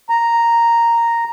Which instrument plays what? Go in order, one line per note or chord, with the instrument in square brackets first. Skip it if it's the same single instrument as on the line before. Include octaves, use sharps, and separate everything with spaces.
[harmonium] A#5